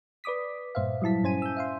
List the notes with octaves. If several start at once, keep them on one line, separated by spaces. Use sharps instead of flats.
B4 D5 D6 D#6 B6
G2 A#2 C5 E5 F5
F#3 G3 E4 A5 B6
G2 C#4 C5 G#5 D#7
E6 G6
E5 F5 C6